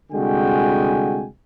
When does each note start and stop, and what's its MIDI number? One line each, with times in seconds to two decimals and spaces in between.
0.12 1.25 36
0.12 1.25 50
0.12 1.25 56
0.12 1.25 66
0.12 1.25 79
0.12 1.25 80